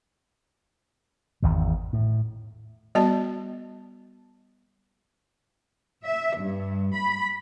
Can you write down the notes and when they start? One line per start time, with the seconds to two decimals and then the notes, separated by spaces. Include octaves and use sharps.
1.42 G#1 E2 D#3
1.93 A2
2.95 G3 B3 F#4 D5 A5
6.05 E5
6.39 G2
6.95 B5